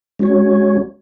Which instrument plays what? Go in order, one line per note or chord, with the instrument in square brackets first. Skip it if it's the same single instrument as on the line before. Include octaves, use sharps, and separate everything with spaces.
[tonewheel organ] G#3 C#4 F#4 C#5